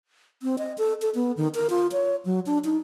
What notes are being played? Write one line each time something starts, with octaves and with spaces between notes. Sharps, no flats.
C4
D#5
A4
A4
B3
D#3
A#4
F4
C#5
F#3
D4
D#4